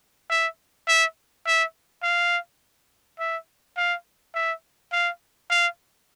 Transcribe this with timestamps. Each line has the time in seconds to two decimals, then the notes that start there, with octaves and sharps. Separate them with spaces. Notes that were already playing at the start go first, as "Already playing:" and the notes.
0.30 E5
0.88 E5
1.46 E5
2.03 F5
3.20 E5
3.77 F5
4.35 E5
4.92 F5
5.50 F5